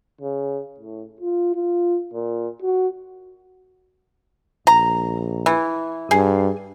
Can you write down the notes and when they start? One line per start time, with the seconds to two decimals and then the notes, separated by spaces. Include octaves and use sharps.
0.21 C#3
0.80 A2
1.20 F4
1.55 F4
2.14 A#2
2.62 F#4
4.67 A#1 A#5
5.46 E3
6.11 G2 G#4